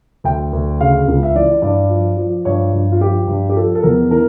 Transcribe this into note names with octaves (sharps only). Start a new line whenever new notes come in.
D2 G5
D2
C#3 F5
C#2
E5
E3 D5
G2 D5
F3
F3
G2 C#5
G2
F4
F3 G4
G2
G4
F3 A4
A4
E2 A#4
E3 A#4